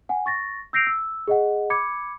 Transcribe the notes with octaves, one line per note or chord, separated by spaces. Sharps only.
F#5 G#5
C#6 A6 A#6
E6 G6 A#6 C7 D7 F7
E6
G#4 D#5 F#5
B5 D6 G#6 C#7